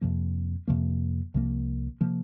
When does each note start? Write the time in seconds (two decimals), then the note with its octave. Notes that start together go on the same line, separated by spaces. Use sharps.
0.01 F2 C3 F3 A#3
0.68 F2 C3 F3 A#3
1.34 C2 C3 F3 A#3
2.01 C3 F3 A#3